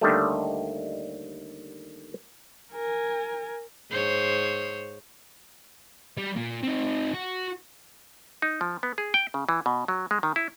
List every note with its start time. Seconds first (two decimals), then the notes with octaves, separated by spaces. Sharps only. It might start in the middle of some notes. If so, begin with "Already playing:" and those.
0.01 D#2 D3 D#3 G3 A3
2.73 A#4 G#5
3.90 G#2 C5 C#5
6.17 G3
6.36 A#2
6.63 C4 D#4
7.14 F#4
8.42 D#4
8.61 F3
8.83 B3
8.98 G#4
9.14 G5
9.34 C#3
9.49 E3
9.66 B2
9.88 F#3
10.11 G#3
10.23 D#3
10.36 E4